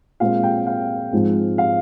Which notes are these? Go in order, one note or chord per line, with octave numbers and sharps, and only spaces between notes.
A#2 G#3 C4 F5
G5
F5
G#2 F3 G#3 C4
F5